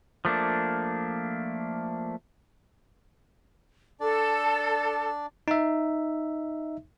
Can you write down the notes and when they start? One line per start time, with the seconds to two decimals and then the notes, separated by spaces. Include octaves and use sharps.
0.25 F3 A3 A#3 D4
4.00 D4 A4 D5
5.48 D#4 E5